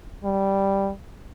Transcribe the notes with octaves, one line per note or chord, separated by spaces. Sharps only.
G3